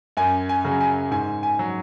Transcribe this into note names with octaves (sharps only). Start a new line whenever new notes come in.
F#2 G#5
G#5
C#3 F#3
G#5
G#2 G#5
G#5
F#3